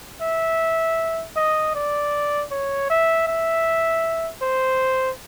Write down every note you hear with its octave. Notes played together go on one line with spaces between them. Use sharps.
E5
D#5
D5
C#5
E5
E5
C5